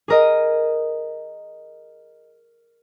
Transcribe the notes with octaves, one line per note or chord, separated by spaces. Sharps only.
G#4 A#4 D#5